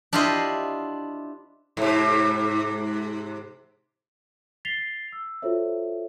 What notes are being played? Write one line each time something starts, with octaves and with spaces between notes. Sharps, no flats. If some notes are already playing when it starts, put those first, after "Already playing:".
D4 E4 F4 G4 C5 D#5
G#2 C3
A6 B6 C7 F7 G7
E6
F4 F#4 A4 C5 C#5 E5